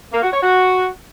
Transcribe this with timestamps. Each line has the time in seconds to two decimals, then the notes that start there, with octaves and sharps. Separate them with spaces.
0.12 A#3
0.22 F#4
0.32 C#5
0.42 F#4